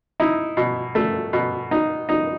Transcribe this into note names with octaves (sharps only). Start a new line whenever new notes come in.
D#4 E4
B2
A3
B2
D#4
D#4